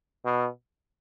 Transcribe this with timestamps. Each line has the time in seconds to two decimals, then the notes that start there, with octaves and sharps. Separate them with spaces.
0.25 B2